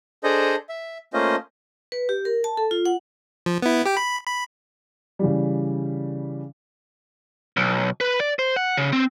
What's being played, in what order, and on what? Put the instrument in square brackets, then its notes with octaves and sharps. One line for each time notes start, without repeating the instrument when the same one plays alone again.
[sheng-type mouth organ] D4 G#4 A4 C5 D#5
E5
A3 A#3 C#4 F4 C5 D#5
[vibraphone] B4
G4
A#4
A5
A4
F4
F#5
[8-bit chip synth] F3
B3 E4
G4 G5
B5
B5
[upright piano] C#3 E3 G3
[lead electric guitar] B1
B4
D5
C5
F#5
C#3
C4